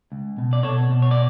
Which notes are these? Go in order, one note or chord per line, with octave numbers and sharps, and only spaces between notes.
C#2
B2
D5
B2 A4 C#5
B2
C#5
D5